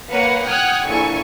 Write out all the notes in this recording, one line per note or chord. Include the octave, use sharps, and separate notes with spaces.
A#3 B4 C#5 F5 F#5
F#5 G5 D#6 F6 F#6 G#6
A#1 A#2 E4 A4 G#5 C#6